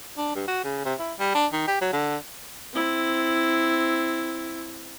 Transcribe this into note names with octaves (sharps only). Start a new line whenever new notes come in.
D4
G2
F#4
C#3
C3
E4
G3
D4
D#3
G4
F#3
D3
C4 E4